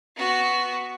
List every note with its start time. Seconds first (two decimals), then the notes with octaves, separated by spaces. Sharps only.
0.16 B3 F#4